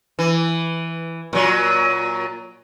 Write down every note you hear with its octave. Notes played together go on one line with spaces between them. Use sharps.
E3
A#2 F#3